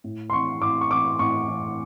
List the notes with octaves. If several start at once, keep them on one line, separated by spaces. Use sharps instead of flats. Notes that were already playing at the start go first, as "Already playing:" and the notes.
A2
C6
E3 C#6
A2 D6
C#6
E3 D6
A2 C#6
E3